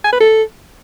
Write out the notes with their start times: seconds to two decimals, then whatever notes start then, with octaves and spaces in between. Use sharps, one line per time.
0.04 G#5
0.12 B4
0.20 A4